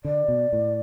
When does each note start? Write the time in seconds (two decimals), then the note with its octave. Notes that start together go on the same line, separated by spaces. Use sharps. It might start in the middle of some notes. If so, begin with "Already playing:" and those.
0.04 D3 D5
0.28 B2
0.53 A2